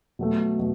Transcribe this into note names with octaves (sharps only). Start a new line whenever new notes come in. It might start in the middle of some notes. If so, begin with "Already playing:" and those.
B2 F#3 A3
B2 F#3